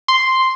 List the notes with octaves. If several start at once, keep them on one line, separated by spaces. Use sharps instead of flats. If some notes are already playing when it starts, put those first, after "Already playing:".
C6